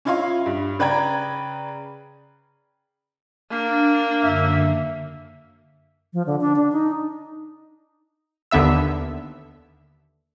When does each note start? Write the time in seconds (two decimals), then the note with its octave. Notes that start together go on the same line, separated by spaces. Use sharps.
0.05 C#4 E4 F4 D#5 F5 C6
0.46 G2
0.79 C#3 B4 D5 G5 A#5 G#6
3.50 A#3 D4
4.22 F#2 D3 E5
6.13 F3
6.26 D3
6.41 D4
6.56 D4
6.72 D#4
8.51 D#2 D3 B3 E5 E6